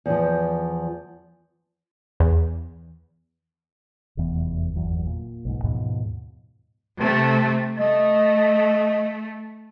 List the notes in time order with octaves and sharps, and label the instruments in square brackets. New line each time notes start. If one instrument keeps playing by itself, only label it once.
[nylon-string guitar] E2 F3
[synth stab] E2
[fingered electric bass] F1 E2 E3 B3
G1 E2 E3 F#3
A#2
B1 G#2
D#2 G#2 B2 F3
[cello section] C3 A3
[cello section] A3 [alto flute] D#5